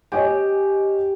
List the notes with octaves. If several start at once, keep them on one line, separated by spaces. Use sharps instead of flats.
G4 C#5 D#5 G#5